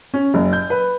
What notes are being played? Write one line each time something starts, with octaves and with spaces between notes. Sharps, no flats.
C#4
F#1
G6
B4